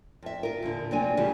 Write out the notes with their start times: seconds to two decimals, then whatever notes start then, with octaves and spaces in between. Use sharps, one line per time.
0.22 F2 E5
0.43 F4 A#4
0.62 E2 A#2 D3
0.91 F2 C3 F#3 A#3 D4 G#5
1.17 C#3 E3 F3 G#3 F4 G4